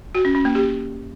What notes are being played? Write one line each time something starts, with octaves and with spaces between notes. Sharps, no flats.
F#4
C#4
C#4
A#3
G4